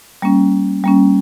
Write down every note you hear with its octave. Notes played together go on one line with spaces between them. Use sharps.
G3 A#3 C#4
G3 A#3 C#4